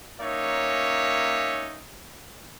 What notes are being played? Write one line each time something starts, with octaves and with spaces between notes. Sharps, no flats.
A#3 C#4 D#4 C#5 E5